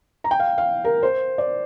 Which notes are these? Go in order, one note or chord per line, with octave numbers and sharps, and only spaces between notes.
A#5
G5
F5
F5
A#4
C5
D5